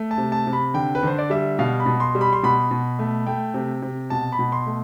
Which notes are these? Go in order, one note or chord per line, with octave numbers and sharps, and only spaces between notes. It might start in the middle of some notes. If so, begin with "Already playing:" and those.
Already playing: A3
A5
C3
A5
C3
B5
D3 G5
B4
D3 C5
D5
G3 E5
B2 F5
B5
B2
C6
G3
B5
C6
B2 B5
B2
A3
A3 G5
C3
C3
B2 A5
B5
B2
C6
A3